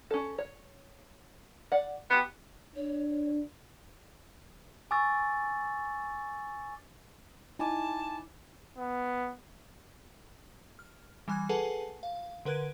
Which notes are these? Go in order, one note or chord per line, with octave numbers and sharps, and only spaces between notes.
C#4 A4
C#5
D5 F#5
B3 F4 G4
D4 C#5
G#5 C#6 D6 E6 A6
D#4 E4 G#5 A5 D6
B3
F6
E3 G3 G#5 F#6 G#6
G#4 A4 B4 F#5 G#5 A5
F5
D3 A#4 B4 F#6 G#6 D7